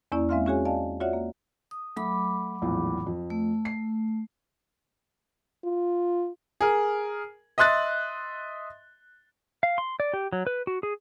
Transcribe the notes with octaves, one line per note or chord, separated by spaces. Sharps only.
E2 A#3 C#4 E4 D5
G#3 C4 E5 F5 C6 F6
C#4 F4 F#4 G#4 C#5 G#5
D5 D#5 F5 G#5 A5
F4 F#4 C#5 D5 E5 F#5
A#3
D#6
F#3 A3 B5 D6
A#1 E2 A2
F2
A3
C7
F4
G#4 A#4
D#5 E5 C6 F#6 A6
F5
C6
D5
G4
F#3
B4
F#4
G#4